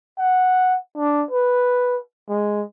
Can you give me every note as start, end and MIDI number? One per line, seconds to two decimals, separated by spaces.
0.18 0.76 78
0.97 1.24 62
1.31 1.99 71
2.29 2.63 56